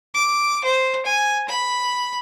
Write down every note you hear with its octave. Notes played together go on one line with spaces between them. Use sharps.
D6
C5
G#5
B5